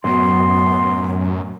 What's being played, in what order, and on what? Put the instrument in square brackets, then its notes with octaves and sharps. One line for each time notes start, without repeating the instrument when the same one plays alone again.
[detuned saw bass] F#2 [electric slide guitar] A2 F#3 [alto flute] B3 [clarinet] C6